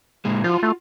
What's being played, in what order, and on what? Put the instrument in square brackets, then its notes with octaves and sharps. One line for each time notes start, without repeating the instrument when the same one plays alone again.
[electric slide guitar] A#2 G#3
[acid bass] F3 [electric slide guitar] F4 F#4
[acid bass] A3